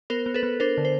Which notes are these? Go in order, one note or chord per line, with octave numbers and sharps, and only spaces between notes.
B3 A#4 C5
B3
A4 B4
B3
D4 A#4 C5
D3
C5